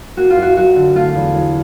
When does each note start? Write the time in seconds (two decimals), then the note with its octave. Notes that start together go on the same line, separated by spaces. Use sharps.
0.17 A#3 F#4
0.30 F4
0.37 F#2
0.42 F#4
0.56 F#3 F#4
0.76 D3
0.95 A3 F4
1.15 E2
1.35 F#3